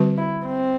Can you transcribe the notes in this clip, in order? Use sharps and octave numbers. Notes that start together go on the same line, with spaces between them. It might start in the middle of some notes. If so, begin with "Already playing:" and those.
Already playing: D3 G3 C4 F#4 B4
E4
C4